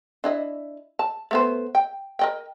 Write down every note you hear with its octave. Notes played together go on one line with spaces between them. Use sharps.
D4 E4 D#5
A5
A3 B3 C5
G5
A#4 D#5 G5